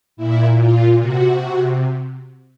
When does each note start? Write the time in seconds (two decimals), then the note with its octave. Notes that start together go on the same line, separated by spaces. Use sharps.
0.17 A#2 E4
0.58 F4
1.00 C3 F#4